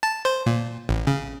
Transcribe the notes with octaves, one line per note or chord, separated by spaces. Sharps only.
A5
C5
A#2
A1
C#3